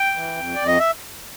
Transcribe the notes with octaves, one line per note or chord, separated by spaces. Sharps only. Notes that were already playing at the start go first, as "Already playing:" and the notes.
Already playing: G5
E3
F2
F2 D5
D#5
E5